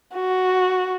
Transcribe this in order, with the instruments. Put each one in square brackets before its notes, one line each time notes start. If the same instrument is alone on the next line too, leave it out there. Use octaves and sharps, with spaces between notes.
[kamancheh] F#4